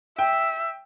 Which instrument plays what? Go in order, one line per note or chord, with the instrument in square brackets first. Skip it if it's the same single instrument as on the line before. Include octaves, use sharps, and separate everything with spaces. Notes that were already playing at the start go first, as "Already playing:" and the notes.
[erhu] E5 [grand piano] G5